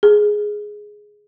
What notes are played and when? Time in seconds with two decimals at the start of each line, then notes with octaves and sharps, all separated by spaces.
0.03 G#4